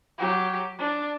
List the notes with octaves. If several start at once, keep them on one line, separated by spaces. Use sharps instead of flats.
F#3 G4
D4